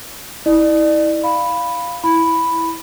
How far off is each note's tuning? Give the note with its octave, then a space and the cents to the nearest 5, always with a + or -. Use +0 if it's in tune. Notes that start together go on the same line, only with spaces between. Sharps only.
E4 -35 D5 +30
F5 +0 B5 +0
E4 +0 B5 +0